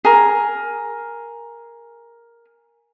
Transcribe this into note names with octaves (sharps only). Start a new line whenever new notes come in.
G#4 A#4